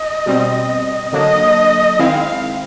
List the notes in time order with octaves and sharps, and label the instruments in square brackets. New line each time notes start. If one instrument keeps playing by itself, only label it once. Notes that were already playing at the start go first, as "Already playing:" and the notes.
Already playing: [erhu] D#5
[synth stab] B2 G3 C4
[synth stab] D3 F#3 A#3 D4 [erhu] D#5
[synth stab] D#3 G#3 C4 E4 [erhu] F5